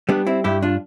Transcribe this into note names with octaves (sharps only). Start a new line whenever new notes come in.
G3 B3 D4
C4 E4
G2 E4 G4
D4 F4